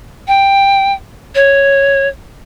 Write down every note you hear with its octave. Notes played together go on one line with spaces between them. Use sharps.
G5
C#5